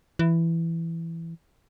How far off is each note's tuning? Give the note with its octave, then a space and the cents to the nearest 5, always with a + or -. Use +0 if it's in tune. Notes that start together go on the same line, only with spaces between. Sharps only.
E3 +10